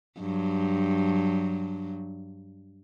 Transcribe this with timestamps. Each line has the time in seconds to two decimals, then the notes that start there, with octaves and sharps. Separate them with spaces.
0.20 G2 F#3